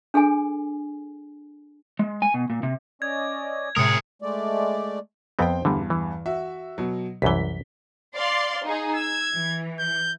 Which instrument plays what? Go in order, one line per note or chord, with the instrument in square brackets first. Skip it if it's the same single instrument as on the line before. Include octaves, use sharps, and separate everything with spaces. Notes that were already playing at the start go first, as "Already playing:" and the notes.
[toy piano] D4 G#4 A4 G#5
[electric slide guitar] G#3
G#5
B2
A#2
C3
[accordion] C#4 D5 D#5 [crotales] G#6
[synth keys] A2 C3 G#3 [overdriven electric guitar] G#4 A#4 [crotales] D#6 C#7
[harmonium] G#3 A3 D5
[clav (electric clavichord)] F2 B3 C4 [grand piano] C5 G5
[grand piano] E2 G2 [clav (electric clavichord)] D3 G3
[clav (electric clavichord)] E3
[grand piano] F#4 E5
B2 F#3
[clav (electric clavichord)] C2 F#2 E3 [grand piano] B6 G7
[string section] D5 F5 C6
D#4 G#4
[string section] E6 [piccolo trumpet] G#6
[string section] E3
[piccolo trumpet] G6